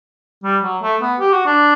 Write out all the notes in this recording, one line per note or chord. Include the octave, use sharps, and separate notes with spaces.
G3
F#3
A3
B3
G4
F#4
D4